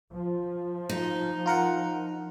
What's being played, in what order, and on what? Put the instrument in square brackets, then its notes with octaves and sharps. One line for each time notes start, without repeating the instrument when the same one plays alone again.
[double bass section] F3
[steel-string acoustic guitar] D#4
[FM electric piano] F4 A#4 F#5